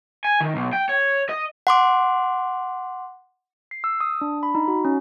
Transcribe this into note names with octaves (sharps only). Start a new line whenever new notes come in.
G#5
D#3
B1
G5
C#5
D#5
F#5 C6 D6
C7
E6
D#6
D4
B5
D#4
F#4
C#4